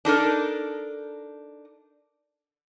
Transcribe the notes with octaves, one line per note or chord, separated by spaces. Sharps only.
D4 D#4 A4 A#4